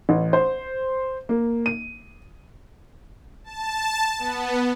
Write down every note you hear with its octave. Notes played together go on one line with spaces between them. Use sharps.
A1
C5
A#3
D#7
A5
B3